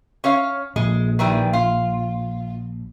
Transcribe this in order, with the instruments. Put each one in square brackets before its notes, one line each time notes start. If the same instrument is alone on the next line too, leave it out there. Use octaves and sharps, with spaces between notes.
[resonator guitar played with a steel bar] C#4 C#5 F5
[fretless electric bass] A#1 [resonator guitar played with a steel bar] G#3
[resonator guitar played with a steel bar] D#3 E3 G3
F4